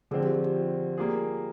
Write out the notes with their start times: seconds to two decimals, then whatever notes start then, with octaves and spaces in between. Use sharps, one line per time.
0.11 D3 F3 C4 G#4
0.23 G4
0.34 F4
0.44 G4
0.97 G3 A#3 F4 G#4